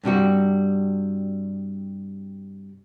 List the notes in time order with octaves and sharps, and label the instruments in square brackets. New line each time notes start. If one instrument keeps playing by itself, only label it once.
[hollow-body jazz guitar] G2 C3 G3 F#4